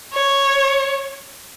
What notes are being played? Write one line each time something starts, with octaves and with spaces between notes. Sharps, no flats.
C#5